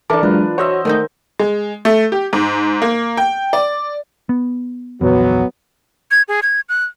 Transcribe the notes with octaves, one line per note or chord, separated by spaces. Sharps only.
E3 D4 A4 A#4 A5 D6
F#3 G#3 D4 F4 B4
F#4 C5 C#5 D#5 E5 F#5
D#3 G#3 A3 D#4 G6
G#3
A3
G4
G#2
A#3
G5
D5
B3
A#1 E2 F#3 B3
G#6
G#4
G#6
F#6